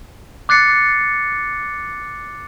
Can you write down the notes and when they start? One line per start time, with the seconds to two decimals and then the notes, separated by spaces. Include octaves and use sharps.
0.49 D6 F#6 A6 C7 C#7